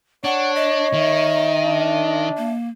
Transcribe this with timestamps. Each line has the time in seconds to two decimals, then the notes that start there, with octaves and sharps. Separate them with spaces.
0.24 D4 C#5 F#5
0.55 D#5
0.93 D#3 E5
1.64 D4
2.38 A#3